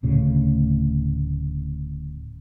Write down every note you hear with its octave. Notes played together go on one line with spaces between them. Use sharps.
D1 D2 A2 C#3